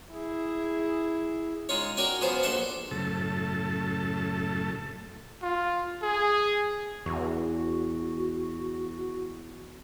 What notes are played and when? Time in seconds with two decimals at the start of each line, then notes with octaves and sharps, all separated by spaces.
0.12 E4 G#4
1.69 G#3 D#4 F4 C#5
1.97 F#4 A#4 C#5 D5 G5 G#5
2.21 F3 F#3 B3 G#4 C5
2.43 A#1 A4 C5 E5 F#5
2.91 F#2 A2 C#3 A4 A5
5.42 F4
6.02 G#4
7.06 E2 F#4